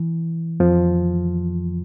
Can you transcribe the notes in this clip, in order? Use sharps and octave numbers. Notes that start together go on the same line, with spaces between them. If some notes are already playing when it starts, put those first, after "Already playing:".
Already playing: E3
F2 F3